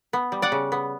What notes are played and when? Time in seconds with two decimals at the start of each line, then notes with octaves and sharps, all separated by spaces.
0.13 B3
0.32 G3
0.42 D5 F#5
0.52 C#3
0.72 B3